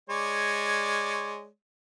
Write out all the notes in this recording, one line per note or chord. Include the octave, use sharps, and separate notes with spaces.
G#3 C#5 D5